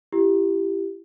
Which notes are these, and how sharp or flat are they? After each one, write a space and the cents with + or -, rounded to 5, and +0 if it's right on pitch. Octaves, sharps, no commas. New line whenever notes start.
E4 +30 G4 +0